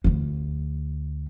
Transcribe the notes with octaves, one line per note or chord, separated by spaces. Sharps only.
D2 D3